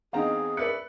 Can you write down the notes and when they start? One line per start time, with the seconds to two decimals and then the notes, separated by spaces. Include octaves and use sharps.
0.13 E2 C4 D#4 G#4 F5 A#5
0.57 B4 D5 E5 F#6 C#7